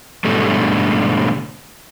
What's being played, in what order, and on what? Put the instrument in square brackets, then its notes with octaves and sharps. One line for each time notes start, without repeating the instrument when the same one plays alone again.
[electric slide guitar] G#2 B2 D3 G3 A3